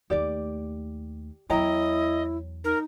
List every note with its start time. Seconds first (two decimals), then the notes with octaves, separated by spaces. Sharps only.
0.10 D#2 A3 G4 D5
1.50 E2 F#3 E4 C#5 D#5 G5 A#5
2.64 D#4 A#4